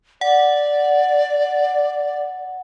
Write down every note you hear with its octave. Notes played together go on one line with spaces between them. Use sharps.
D5 F#5